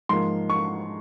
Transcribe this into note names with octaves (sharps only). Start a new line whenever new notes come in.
G#2 F3 A#3 C6
C#6